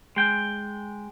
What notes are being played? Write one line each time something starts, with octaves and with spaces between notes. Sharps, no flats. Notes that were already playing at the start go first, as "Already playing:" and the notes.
G#3 G5